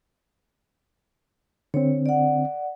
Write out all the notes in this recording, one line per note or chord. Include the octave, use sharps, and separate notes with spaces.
D3 C4 C#5
D5 F#5